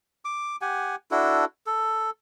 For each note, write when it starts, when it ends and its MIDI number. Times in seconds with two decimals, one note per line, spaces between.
0.25 0.56 86
0.61 0.96 67
0.61 0.96 78
0.61 0.96 80
1.11 1.45 62
1.11 1.45 64
1.11 1.45 66
1.11 1.45 69
1.66 2.10 69